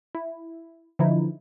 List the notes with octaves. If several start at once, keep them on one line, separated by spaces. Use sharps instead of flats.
E4
D3 E3 F3 D#4 E4